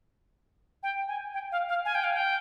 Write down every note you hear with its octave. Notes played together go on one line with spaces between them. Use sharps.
G5
G#5
G5
F5
F5
G#5
G5
F5
G5